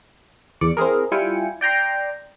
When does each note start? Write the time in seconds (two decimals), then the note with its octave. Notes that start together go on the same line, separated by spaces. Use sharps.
0.61 E2 D5 C#7
0.77 C4 E4 G#4 A#4
1.12 G3 E4 F4 G5 G#5 C#7
1.61 D5 G5 A#5 C6